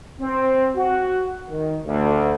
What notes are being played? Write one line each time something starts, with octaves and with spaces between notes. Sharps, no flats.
C4
F#4
D#3
D2